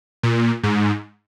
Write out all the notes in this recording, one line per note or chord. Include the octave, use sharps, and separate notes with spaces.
A#2
G#2